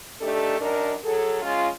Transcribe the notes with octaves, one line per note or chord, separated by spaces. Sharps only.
A3 D4 D#4 G4 A4
F#2 D4 D#4 A#4
F#3 G#4 A4
G#3 C#4 F4